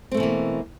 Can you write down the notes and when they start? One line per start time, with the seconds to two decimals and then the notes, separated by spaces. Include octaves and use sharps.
0.12 C4
0.14 A3
0.17 B2
0.20 E3
0.23 A#3